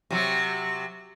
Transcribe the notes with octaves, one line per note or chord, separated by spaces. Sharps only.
C3 F#3